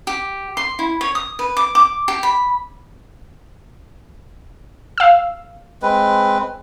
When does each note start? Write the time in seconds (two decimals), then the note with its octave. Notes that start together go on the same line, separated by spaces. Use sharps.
0.07 G4
0.57 C6
0.79 E4
1.01 C#5
1.15 D#6
1.39 B4
1.57 D6
1.75 D6
2.08 G4
2.23 B5
4.98 F5 E6
5.82 G#3 C4 B4